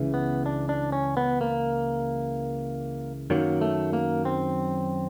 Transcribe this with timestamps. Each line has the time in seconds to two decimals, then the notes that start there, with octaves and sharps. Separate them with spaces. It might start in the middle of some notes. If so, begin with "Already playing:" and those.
Already playing: C#2 C#3 E3
0.14 B3
0.46 D4
0.69 D4
0.92 C#4
1.17 B3
1.41 A#3
3.30 F#2 D#3 F#3 A#3
3.61 A3
3.93 A#3
4.25 C4